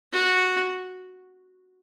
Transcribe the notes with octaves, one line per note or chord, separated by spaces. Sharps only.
F#4